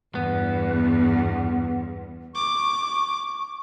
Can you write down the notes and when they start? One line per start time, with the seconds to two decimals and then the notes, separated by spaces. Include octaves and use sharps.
0.15 E2 G2 B3
2.35 C#6 D6